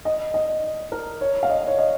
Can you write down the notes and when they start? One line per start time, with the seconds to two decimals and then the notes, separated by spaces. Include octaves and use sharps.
0.05 D#5
0.34 D#5
0.92 A#4
1.21 C#5
1.43 F5
1.49 D#5
1.67 C#5
1.78 D#5